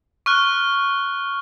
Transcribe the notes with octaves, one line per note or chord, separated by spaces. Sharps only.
C#6 F6 F#6